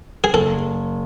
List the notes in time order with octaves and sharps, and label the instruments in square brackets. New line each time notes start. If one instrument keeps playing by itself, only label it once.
[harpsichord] G#4
[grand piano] F#1 [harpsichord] A4